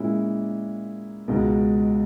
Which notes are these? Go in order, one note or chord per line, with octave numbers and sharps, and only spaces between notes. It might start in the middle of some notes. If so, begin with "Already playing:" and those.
Already playing: A#2 G#3 C#4 E4
C#2 B2 G#3 D#4